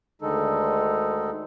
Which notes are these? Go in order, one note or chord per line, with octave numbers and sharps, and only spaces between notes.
D2 D3 D#3 G#3 D#4 A4